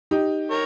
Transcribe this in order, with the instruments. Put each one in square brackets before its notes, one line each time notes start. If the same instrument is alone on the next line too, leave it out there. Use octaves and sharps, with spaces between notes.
[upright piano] D#4 G4
[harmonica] A#4 C#5